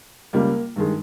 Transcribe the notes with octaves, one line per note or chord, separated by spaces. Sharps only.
C#2 C#3 G3 A#3
G2 D#3 G#3